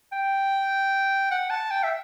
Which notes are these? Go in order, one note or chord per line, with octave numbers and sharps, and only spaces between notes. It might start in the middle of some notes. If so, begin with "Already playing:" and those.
G5
F#5
A5
G5
E5